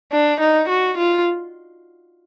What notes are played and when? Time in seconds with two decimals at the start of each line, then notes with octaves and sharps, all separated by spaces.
0.12 D4
0.40 D#4
0.69 F#4
0.98 F4